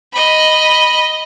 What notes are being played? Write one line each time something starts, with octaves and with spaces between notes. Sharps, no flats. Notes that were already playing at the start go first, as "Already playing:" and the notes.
D#5 B5